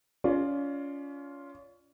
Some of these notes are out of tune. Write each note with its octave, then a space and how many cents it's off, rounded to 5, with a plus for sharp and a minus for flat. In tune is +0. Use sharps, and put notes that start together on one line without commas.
C#4 +30 F4 +0 D5 +20